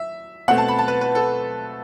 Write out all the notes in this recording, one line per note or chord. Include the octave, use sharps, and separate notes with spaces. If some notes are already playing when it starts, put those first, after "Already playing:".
Already playing: E5
B2 A3 C4 F#5
A5
B5
A5
B4
B4
A4